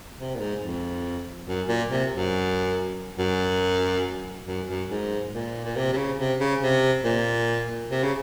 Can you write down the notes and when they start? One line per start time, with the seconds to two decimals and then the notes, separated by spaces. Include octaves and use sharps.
0.18 C3
0.35 A#2
0.39 G#2
0.61 F2
1.47 F#2
1.68 A#2
1.90 C3
2.11 F#2
3.18 F#2
4.46 F#2
4.68 F#2
4.90 G#2
5.33 A#2
5.65 A#2
5.76 C3
5.93 C3
5.97 C#3
6.18 C3
6.40 C#3
6.62 C3
7.04 A#2
7.90 C3
8.03 C#3